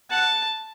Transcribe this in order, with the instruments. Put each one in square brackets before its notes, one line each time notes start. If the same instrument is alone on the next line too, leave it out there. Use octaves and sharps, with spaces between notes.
[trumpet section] F#5 [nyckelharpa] A5